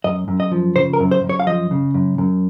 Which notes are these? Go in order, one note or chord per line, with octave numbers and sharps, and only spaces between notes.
F#2 D#5
F#2
D#5
F3
C#3 C5
A#4
F#2
C5
F#2
C#5
F5
F3 D#5
C#3
F#2
F#2